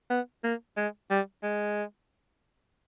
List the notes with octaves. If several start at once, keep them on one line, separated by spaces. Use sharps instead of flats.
B3
A#3
G#3
G3
G#3